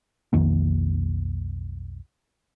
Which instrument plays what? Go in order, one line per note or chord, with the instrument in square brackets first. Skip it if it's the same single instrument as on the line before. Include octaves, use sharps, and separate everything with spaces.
[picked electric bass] B1 F2 D#3 A#3